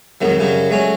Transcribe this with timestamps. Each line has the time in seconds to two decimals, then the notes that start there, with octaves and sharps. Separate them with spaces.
0.21 F2 G#2 D#3 F#3
0.39 F#2 C#3 F#3 G3
0.70 F#3 G#3 A3 C#4